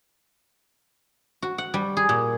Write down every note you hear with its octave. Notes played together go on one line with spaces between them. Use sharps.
F#4
F#5
G3
G#4
A#2